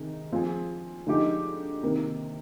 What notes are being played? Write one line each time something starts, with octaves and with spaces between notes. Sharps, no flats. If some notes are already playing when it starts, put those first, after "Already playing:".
Already playing: C3 D#3 G#3 D#4
F3 C4 F4 G#4
D3 F3 G#3 D#4 G4
C3 D#3 A#3